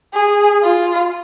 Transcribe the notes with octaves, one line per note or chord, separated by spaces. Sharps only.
G#4
F4